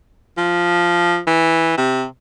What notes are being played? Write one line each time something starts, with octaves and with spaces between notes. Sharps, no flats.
F3
E3
C3